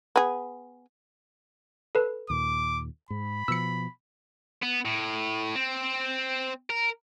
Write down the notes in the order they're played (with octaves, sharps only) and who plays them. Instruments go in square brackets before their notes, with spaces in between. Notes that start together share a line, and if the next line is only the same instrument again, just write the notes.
[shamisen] B3 G#4
[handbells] A4 B4
[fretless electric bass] D#2 A#2 [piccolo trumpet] D6
[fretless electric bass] G#2 [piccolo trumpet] B5
[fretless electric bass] B2 F3 [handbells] E6 C#7
[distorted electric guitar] B3
A2
C4
A#4